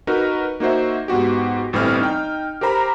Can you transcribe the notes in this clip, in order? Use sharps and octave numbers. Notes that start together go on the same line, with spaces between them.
D#4 F#4 A#4 B4
A#3 D#4 F#4 C5 E5
G#2 B3 F#4 G4
G1 A2 E3 G3 C4 F6
D#4 G5
G4 A#4 C5 A#5 B5